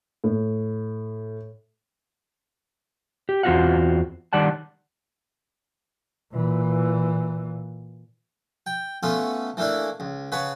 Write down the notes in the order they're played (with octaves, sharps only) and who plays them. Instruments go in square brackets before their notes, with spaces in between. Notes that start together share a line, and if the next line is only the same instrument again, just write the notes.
[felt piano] A2
[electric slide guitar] G4
E2 C4 F4 F#4 F5 F#5
D#3 G3 D5 F#5 A5
[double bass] A#2 E3
[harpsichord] G5
A3 B3 C#4 F4
E3 A3 A#3 D4 E4
C#2
C#3 B4 C#5 F#5 A5